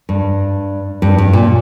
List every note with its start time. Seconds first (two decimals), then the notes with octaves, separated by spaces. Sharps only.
0.09 G2
1.02 G2
1.18 G2
1.33 A#2